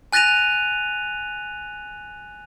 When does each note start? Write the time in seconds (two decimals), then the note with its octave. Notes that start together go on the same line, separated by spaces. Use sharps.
0.13 G#5 F#6 A6 A#6 D#7 F7